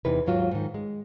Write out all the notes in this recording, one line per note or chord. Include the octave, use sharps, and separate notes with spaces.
E2 C3 D#4 E4 B4
D#2 G#2 F#3 F4 F#4
G#2 D#3
G#3